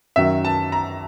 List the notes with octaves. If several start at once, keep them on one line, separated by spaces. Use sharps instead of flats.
F#2 D#3 F#3 E5
A5
A#5